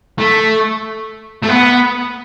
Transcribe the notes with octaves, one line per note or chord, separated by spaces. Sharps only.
A3
A3
B3